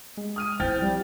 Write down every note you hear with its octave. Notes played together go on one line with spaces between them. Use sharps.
G#3
D#6 F6 D#7
C4 E4 C5 G5 F6 A6
F3 G3